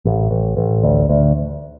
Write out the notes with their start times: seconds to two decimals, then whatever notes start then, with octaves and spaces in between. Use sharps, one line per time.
0.05 A1
0.31 A1
0.57 A1
0.83 D2
1.09 D2